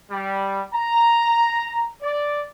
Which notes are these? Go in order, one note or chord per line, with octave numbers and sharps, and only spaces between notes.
G3
A#5
D5